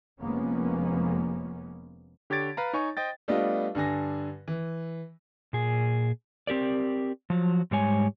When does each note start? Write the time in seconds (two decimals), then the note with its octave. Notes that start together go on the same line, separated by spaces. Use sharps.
0.19 F1 F3 G#3 A#3 B3 C#4
2.30 D3 G4 C#5 G#6 A6 D7
2.57 B4 F5 A#5
2.73 D#4 C#5 G#5 C#6
2.97 C5 D#5 G5 A6
3.28 G3 A3 B3 D4 F4 D#5
3.75 G2 D3 G#5 A#6
4.48 E3
5.53 A#2 G#4
6.47 C4 G4 A#4 D5
7.30 F3 F#3
7.71 G#2 G3 G#3 C#5 G#5